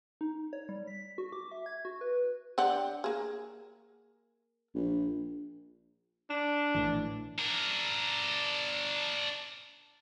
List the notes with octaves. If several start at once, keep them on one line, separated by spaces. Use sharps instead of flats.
D#4
C#5
G3
B6
F#4
D6
E5
G#6
F#4
B4
D3 G4 F#5
A#3 G#4
A#1
D4
A#1 A2 E3
D4 A#4